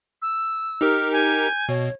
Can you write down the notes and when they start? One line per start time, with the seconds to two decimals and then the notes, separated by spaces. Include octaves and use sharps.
0.22 E6
0.81 D#4 G4 A#4 F6
1.12 G#5 G6
1.69 B2 C#5